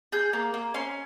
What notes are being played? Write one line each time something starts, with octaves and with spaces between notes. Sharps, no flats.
G#4 G6
A#3
A#3
C#4 C6